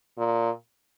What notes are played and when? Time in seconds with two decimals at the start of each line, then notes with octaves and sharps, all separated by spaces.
0.18 A#2